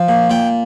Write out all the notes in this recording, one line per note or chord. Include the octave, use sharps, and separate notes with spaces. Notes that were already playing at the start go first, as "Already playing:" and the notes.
Already playing: F3
A#2
A#2 G5